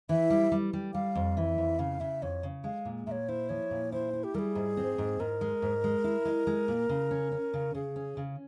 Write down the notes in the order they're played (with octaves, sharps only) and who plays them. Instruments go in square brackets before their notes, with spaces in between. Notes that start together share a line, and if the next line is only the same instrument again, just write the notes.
[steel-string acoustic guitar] E3 [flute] E5
[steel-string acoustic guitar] G3
G3
G3
[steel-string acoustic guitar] G3 [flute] F5
[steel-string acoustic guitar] F2
[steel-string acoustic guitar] E3 [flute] E5
[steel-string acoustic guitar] F2
[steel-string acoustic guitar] C#3 [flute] F5
[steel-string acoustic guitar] C#3 [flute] E5
[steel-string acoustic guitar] F2 [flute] C#5
[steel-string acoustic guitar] C#3
[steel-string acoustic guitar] G#3 [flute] F5
[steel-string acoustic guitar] A#2
[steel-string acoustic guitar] A#2 [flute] C#5 E5
[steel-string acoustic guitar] E4 [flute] C5
[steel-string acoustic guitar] F3 [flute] C#5
[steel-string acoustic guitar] A#2
[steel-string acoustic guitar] E4 [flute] C5
[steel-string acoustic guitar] E4
[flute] G4
[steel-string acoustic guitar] G3 [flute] A#4
[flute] G#4
[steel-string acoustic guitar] G#2
C4
G#2
[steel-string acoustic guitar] G#2 [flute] A#4
[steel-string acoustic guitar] G#3
G#2
G#3
E4
G#3
G#3
A#2
C#3
C#4
C#4
C#3
[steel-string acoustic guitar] C#3 [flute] G#4
[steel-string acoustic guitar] C#4
C#3